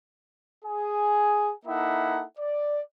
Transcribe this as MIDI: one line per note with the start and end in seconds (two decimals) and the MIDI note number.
0.65 1.53 68
0.65 1.53 80
1.66 2.24 58
1.66 2.24 63
1.66 2.24 64
1.66 2.24 69
1.66 2.24 76
1.66 2.24 78
2.39 2.80 74